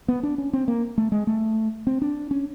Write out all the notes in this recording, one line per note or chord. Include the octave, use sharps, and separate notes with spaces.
B3
D4
C#4
C4
A#3
A3
G#3
A3
C4
D4
C#4